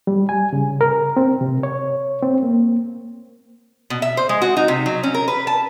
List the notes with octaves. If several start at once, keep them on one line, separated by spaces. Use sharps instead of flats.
G3
G#5
C#3
A#4
C4
C3
C#5
C4
A#3
B2
E5
C5
G#3
F#4
D#4
C3
F#3
C#4
A#4
B4
A5